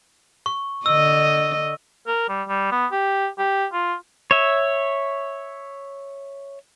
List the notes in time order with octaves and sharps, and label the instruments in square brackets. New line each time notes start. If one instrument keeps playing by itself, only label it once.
[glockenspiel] C#6
[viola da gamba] D3 D#5 [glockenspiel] E6
[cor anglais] A#4
G3
G3
B3
G4
G4
F4
[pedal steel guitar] C#5 E5